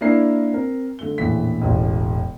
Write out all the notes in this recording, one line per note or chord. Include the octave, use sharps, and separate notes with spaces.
A#3 D4 E4 A#4 C7
C4 A#4
D3 A3 G7
A#1 E2 A2 E3 B6
E1 A1